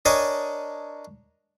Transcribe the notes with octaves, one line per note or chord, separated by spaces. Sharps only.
D4 A#4 C#5 D#5 G#5 A5